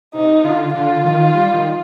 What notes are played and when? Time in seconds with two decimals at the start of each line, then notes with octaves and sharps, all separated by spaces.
0.14 C3 D#4
0.44 D3 F4
0.74 D3 F4
1.05 D#3
1.34 G3
1.53 D#3